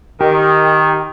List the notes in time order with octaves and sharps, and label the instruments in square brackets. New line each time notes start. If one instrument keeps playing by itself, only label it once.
[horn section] D#3 [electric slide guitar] G4